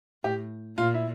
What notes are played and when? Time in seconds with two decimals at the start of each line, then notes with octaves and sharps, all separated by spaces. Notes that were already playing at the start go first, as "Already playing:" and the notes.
0.24 A2 G4
0.77 A#2 F4
0.94 E4